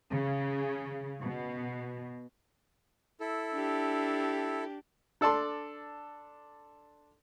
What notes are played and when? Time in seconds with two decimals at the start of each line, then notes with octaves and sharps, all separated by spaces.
0.12 C#3
1.24 B2
3.20 E4 A4
3.53 D4 G4
5.21 D4 A4 D5 A5 C6